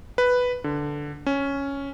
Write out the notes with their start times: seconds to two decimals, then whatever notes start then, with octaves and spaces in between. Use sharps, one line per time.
0.18 B4
0.64 D3
1.26 C#4